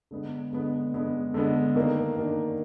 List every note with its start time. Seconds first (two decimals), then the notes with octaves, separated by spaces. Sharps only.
0.11 D3 G#3 B3
0.53 D3 G#3 B3
0.94 D3 G#3 B3
1.34 D3 G#3 B3
1.75 D#3 A#3 D4
2.16 D#3 A#3 D4